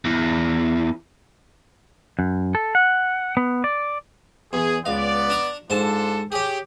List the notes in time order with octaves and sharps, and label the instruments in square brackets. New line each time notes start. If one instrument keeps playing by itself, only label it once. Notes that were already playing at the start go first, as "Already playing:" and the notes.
[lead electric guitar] E2 E3
[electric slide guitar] F#2
A4
F#5
B3
D5
[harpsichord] E2 [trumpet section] G#4
[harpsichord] C#2 F5 [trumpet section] B3 D5
[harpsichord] D4 A#5 C#6
[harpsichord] G#2 C5 A5 [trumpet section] D4 F4 A4
[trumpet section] G4 [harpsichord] G#4 C#5